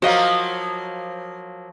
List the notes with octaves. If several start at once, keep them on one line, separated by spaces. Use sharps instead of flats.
F3 F#3 A#3 F#4 D#5 F5